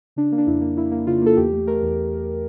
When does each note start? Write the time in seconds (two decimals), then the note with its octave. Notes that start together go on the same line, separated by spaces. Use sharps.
0.16 C#3 D4
0.32 A#3
0.38 D4
0.47 F2 E4
0.61 A#3
0.77 A#3 E4
0.92 A#3
1.07 C#3 F4
1.22 A#3 A4
1.37 E2 G4
1.52 A3
1.67 A3 A#4
1.82 E2